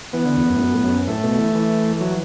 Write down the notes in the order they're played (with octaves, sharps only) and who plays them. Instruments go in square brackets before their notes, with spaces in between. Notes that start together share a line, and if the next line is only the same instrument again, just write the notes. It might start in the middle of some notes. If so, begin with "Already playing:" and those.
[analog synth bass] E3 [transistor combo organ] B3
[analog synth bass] D3
E2
F#2
A2
F#2
A2
F#2
[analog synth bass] A2 [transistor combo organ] A3
[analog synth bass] B2
E3
E3
[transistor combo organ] F#3